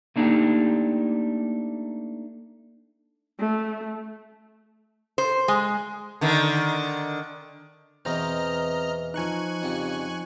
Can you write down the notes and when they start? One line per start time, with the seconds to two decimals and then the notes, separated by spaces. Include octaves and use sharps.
0.16 A3 A#3 D4 D#4 F#4 G4
3.39 A3
5.18 C5
5.48 G#3
6.21 D3 D#3
8.05 E2 B2 E3 C4 C5 D#5 A#5 F6
9.14 F3 D#4 G#5 C#6 F#6
9.62 F2 C#3 G3